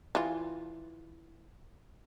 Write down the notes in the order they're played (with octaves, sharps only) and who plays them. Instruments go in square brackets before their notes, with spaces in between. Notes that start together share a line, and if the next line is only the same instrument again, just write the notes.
[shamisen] E3 F4